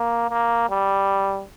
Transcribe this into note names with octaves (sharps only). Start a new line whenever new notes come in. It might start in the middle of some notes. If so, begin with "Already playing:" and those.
Already playing: A#3
A#3
G3